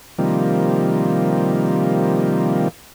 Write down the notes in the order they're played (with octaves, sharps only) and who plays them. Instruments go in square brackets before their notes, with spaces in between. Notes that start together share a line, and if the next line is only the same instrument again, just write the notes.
[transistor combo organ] C3 D#3 F3 G3 A#3